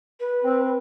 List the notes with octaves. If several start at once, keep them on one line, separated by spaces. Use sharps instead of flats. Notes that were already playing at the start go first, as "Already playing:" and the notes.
B4
C4